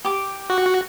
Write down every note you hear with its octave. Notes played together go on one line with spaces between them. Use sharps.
G4 D6
F#4